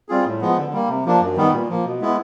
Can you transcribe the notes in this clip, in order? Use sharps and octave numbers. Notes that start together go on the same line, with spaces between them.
G3 C4 F4 G#4
A2
F3 G#3 B3
D3
G3 A#3
C3
F3 A#3 D4
F#2
D#3 G3 B3
A#2
F3 A#3
B2
G#3 B3 E4